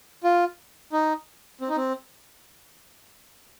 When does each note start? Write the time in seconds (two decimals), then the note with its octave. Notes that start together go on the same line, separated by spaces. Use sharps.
0.24 F4
0.92 D#4
1.61 C4
1.69 D#4
1.77 C4